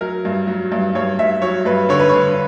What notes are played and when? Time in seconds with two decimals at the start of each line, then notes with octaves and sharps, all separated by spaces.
0.01 F#3 A#4
0.25 G2
0.47 F#3
0.72 G2
0.95 G2 C#5
1.19 G2 E5
1.42 F#3 C#5
1.65 G2 B4
1.89 D3 C#5
1.99 B4
2.09 D3 C#5